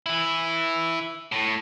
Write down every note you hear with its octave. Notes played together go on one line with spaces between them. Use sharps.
E3 E4
A2